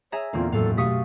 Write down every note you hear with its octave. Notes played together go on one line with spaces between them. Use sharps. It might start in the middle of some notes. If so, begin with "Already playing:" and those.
G#4 C#5 E5 A#5
E2 A#2 D3 A#3 C4 F4
F#2 A2 A4 F5
B2 A3 G4 F5 C#6 D#6 B6